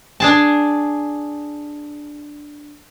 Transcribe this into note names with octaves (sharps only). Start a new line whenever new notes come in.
D4 G#4 A5